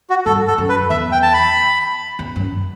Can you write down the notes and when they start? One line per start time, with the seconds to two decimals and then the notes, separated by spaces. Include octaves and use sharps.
0.10 F#4
0.26 G2 A4
0.47 A4
0.58 F#2
0.69 B4
0.90 E2 E5
1.12 G5
1.23 A5
1.33 B5
2.19 E2
2.36 F#2